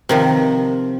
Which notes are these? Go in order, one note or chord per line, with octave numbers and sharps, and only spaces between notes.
C3 D#3 F3